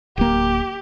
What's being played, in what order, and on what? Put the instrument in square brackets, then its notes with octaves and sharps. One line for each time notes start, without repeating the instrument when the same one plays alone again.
[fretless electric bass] D1 A#3 [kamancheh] G4